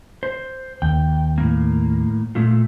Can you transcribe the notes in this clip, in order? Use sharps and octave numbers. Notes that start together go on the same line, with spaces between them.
C5
D#2 G5
A2 A#3
A#2 A3 F4